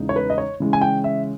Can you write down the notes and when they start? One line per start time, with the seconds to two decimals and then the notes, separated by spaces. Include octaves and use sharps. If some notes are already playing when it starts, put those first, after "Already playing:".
Already playing: E2 C#3 G#3 D#4
0.09 C#5
0.16 B4
0.30 D#5
0.38 C#5
0.60 C#3 E3 G#3 C#4
0.73 G#5
0.81 G5
1.04 E5